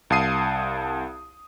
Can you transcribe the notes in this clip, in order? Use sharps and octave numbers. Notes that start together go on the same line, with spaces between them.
C2 F5 A5 D#6 C7 D#7